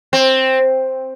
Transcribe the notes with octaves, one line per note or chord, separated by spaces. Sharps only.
C4